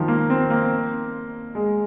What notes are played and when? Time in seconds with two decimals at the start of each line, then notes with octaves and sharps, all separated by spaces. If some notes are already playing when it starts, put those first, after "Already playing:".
Already playing: D#3 F3
0.08 A#3
0.30 C4
0.50 A#3
1.55 G#3